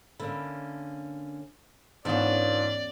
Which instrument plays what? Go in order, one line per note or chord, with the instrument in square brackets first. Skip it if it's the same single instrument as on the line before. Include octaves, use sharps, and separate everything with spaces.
[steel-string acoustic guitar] D3 A#3 C#4 [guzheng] E4
[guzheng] E2 C#4 [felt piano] G#2 [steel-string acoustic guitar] B3 D4 F4 [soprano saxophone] D5